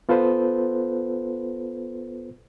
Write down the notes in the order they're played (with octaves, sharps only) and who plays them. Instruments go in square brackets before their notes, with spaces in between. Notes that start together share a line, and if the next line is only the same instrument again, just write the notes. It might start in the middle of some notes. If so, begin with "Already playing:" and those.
[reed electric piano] B3 F4 A4 B4 C5